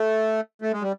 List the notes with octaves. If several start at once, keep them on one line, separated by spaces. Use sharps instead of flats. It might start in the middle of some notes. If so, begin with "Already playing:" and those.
Already playing: A3
A3
G#3
G3